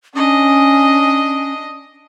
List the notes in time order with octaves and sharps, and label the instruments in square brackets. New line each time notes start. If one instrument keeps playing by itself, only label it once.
[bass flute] C#4 [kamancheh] D4 D#5